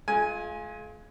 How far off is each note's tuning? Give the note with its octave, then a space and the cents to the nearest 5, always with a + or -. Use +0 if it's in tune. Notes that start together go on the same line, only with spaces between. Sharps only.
G#3 +40 F4 +0 G#5 +0